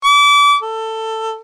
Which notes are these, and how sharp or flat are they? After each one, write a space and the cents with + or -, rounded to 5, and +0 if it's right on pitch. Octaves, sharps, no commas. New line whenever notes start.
D6 -30
A4 +15